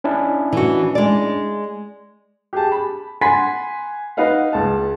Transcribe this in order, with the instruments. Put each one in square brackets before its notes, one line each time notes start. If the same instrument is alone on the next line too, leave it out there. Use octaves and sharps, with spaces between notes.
[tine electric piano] C#4 D4 E4
[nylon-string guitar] E3 F#4
G#3 D5
[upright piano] G4 G#4 A5
B5
F#5 G#5 B5 C6 B6 C7
D#4 B4 F5 F#5
C#2 A5